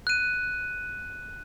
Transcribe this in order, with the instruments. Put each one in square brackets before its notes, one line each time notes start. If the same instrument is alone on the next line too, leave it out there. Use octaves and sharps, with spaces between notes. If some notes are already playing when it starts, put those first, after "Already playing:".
[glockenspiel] F#6 D#7